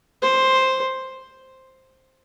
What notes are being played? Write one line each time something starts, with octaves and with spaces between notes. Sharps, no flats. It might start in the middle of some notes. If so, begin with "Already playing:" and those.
C5